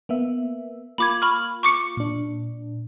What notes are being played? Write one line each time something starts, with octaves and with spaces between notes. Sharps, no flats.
A#3 B3 E5
A#3 F4 B5 D6 G#6
B5 C#6 F6
C#6 D6 C#7
A#2 D4